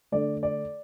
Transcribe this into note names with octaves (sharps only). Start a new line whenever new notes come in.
D3 A3 D5
D5